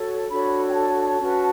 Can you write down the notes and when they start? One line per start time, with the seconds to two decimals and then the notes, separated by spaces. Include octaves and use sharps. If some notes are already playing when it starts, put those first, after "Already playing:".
Already playing: F#4 A4 C#5
0.29 D4 F#4 A4 C#5 B5
0.69 G5
0.74 A5
1.19 C#4 F#4 B4